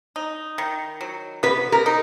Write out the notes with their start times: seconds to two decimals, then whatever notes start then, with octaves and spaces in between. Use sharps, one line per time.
0.16 D#4
0.58 D#3
1.01 F#3
1.43 B3 B4
1.72 A#4
1.86 D#4